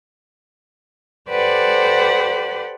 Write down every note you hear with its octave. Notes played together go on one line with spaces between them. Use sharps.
G4 A4 B4 C5 D5 F#5